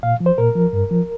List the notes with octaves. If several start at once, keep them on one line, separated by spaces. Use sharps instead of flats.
A#2 F5
F3
C5
A#2 A#4
F3
G2
F3